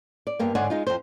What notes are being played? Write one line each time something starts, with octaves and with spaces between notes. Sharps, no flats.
D5
G2 A#3 B3
G#2 D3 C#5 D5 F#5 G#5
G#3 D#4 F4
F2 C5